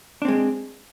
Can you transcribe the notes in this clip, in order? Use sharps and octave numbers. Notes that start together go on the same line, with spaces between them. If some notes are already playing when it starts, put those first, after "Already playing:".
G#3 C4 D4